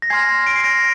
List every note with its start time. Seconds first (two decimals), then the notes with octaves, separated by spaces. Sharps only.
0.02 A#6
0.10 G#5 C6 F6 G#6 C7
0.46 D7
0.56 C7
0.64 A#6 D7